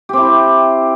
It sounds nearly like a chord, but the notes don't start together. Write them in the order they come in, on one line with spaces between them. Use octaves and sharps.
G4 C4 E4